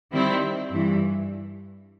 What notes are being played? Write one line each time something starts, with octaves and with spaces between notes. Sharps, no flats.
D#3 G3 C4 E4
G2 E3